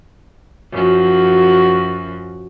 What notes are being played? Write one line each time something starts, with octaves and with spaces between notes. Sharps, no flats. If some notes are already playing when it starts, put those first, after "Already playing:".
F#2 F3 F#4